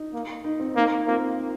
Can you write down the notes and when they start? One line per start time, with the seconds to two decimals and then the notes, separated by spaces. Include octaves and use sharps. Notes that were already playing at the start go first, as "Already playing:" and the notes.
Already playing: D#4
0.13 A#3
0.44 D#4
0.60 C4
0.76 A#3 D#4
1.07 A#3 C4 F4